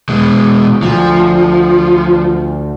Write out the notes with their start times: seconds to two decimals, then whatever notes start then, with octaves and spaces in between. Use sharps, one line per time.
0.09 B2 G#3
0.83 D2 F3